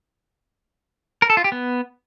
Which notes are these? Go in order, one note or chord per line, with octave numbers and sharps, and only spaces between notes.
A#4
A4
F4
G4
B3